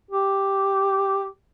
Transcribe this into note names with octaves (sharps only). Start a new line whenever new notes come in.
G4